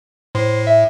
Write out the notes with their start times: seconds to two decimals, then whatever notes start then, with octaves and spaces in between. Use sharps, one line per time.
0.35 A2 C5
0.66 E5